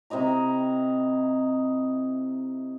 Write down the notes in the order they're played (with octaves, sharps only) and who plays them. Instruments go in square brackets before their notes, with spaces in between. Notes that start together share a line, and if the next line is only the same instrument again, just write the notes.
[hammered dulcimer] C3 E4 D#5 A#5